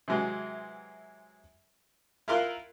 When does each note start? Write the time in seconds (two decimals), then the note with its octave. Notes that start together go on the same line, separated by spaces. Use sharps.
0.08 C3 E3 F#3 G#3
2.28 E4 F4 A#4 F5 C6 F#6